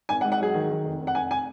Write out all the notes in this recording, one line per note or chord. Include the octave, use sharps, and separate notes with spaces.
G#1 G#5
F#5
G#2
F#5
F#3 G#4
D#3
D#3
F1
F1
F#5
F1 G#5
G#5